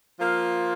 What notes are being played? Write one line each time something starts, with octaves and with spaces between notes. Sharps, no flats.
F3 A#3 F4